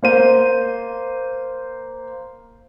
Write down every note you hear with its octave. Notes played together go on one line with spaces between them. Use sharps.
A#3 C5 D#7